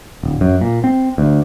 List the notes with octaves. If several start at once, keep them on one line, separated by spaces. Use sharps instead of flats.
D1
F#2
A#2
C4
D2